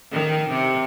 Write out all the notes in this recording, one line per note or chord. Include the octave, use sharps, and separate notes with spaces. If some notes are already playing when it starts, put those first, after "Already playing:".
D#3
C3